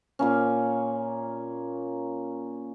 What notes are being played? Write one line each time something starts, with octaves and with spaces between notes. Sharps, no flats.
A#2 A#3 C#4